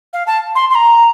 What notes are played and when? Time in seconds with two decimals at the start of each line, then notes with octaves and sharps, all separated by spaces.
0.13 F5
0.27 A5
0.55 C6
0.71 C6
0.75 A#5